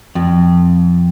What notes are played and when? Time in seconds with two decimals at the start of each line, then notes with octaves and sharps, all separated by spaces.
0.15 F2